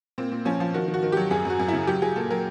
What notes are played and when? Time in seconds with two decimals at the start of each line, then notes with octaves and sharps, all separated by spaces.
0.18 A#2 C4
0.32 A#2
0.45 F3 C#4
0.60 F3
0.74 D#3 F#4
0.88 D#3
0.94 F#4
1.03 D#3
1.12 F#3 G4
1.31 F#2 G#4
1.45 F#2 F#4
1.59 F#2
1.68 C#3 E4
1.87 F#3 G4
2.02 F#3 G#4
2.16 A#2 A4
2.30 F#3 A#4